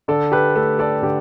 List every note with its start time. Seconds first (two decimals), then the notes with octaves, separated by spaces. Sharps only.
0.08 D3 A4 D5
0.32 G4 B4
0.56 A3 D4 A4
0.79 A4 D5
1.02 D3 G4 B4